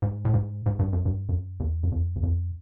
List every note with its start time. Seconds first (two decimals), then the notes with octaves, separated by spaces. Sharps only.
0.02 G#2
0.25 A2
0.34 G#2
0.66 G#2
0.79 G2
0.93 F#2
1.05 G2
1.29 F#2
1.60 E2
1.83 F#2
1.92 F2
2.16 E2
2.23 F2